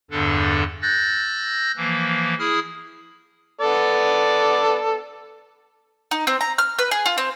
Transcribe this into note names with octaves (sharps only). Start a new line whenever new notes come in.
E2 G2 D3 D4 A4
E6 F#6 G6 A6 A#6
E3 F3 A#3
E4 G#4 D#6 F6
B3 A4 D5
D#4
C4
A#5
F6
B4
G#4
F4
C4